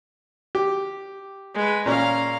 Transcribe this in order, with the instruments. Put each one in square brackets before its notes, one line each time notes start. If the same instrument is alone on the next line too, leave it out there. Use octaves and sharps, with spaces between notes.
[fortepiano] G4
[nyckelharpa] G#3 B4
[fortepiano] A#2 C#4 [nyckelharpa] F5 A#5